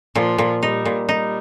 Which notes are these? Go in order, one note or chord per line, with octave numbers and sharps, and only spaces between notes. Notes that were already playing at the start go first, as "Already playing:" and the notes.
A#2 F3
A#2
G3 D#4
A#2
G3 D#4